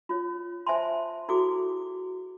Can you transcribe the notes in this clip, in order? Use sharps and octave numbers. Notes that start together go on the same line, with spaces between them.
F4 C#5
C5 E5 G#5 A5 C6
E4 F#4 G#4 A4 D6